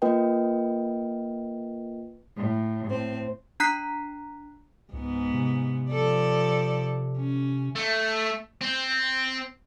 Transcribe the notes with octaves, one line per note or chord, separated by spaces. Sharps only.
A#3 F4 A#4 B4 D#5 G5
A2
A2 C4
D4 A#5 F#6 B6 C7
C#2 G#2 B3
C3
F3 A4 D5
C#4
A3
C4